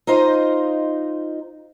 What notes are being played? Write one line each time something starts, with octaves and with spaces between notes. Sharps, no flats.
D#4 F4 C5 D#5